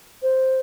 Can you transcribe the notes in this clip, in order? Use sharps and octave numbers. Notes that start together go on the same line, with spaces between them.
C5